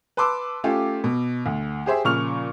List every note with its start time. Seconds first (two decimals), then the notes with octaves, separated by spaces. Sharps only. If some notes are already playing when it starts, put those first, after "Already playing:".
0.17 B4 A5 C6 D6 E6
0.64 A3 C#4 F4 G4
1.04 B2
1.46 D2
1.86 G4 G#4 C5 E5
2.05 A#2 C#3 F3 C#6 F6 F7